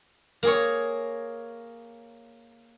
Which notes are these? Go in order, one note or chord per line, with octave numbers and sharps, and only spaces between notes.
A#3 G#4 C#5